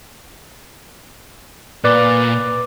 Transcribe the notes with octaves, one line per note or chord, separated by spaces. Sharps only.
A#2 B4 D5 D6